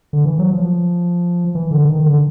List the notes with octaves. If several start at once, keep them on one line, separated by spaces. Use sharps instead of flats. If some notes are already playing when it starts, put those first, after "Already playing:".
D3
E3
F#3
F3
E3
D3
D#3
D3